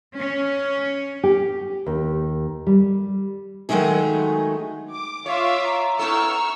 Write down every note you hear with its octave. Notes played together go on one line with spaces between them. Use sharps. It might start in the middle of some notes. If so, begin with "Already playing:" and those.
C#4
G4
D#2
G3
D#3 F#3 G#3 A3 D#4 G#4
D6
F4 C#5 E5 D6
A#5
B3 E4 A4 C#6 E6 F6